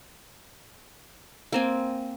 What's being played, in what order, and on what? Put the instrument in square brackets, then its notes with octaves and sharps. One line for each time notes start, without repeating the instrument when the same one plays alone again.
[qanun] A#3 C4 G#5